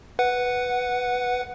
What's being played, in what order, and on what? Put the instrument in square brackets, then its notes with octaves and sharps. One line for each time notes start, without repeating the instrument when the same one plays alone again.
[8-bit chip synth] B4 F#5